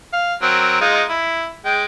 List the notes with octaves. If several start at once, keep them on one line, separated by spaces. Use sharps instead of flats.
F5
F#3 C4 A#4
G#3 D#4 F4
E4
G#3 G5